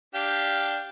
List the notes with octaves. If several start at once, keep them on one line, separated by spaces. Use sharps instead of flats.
D4 G4 F5